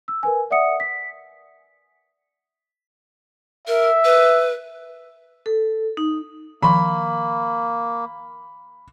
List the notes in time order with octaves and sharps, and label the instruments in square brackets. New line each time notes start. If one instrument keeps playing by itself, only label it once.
[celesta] E6
A#4 B4 G#5
D5 E5 F#5 D#6 C#7
B6
[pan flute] A#4 [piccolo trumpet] E5
[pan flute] B4
[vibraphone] A4
D#4
[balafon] D#3 F3 C6 [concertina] A#3 [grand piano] B5